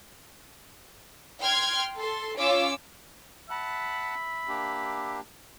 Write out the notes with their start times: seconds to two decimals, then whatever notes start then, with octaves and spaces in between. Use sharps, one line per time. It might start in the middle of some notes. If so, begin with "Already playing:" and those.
1.42 G5 C6 F6 G#6
1.99 A4 C6
2.37 C#4 F4 C#5 D6 E6
3.50 E5 F#5 A5 B5 F#6
4.48 A#3 D4 G4